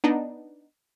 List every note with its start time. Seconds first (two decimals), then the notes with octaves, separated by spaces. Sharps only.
0.04 B3 D4 D#4